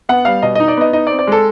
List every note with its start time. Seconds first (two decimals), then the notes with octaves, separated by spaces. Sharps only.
0.09 B3 F#5
0.25 G3 F5
0.42 B2 D#5
0.55 D#4 D#5
0.68 D5
0.77 B3 D#5
0.93 D#4 D#5
1.07 D5
1.10 C4
1.19 D5
1.27 G#3 A4